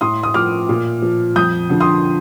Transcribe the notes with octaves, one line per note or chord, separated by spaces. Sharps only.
A2 C6 D#6
D#6
F3 D6 F6
A#2
F3
F2 D#6 G6
D3 F3
C6 D#6